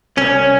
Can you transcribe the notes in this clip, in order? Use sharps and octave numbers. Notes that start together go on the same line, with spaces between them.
C2 C#4